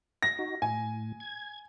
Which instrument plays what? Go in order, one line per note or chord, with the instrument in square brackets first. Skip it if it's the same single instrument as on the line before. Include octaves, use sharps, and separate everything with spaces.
[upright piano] A#6
[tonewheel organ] D#4 F#4
[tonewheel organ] A2 [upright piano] G#5
[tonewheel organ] G#6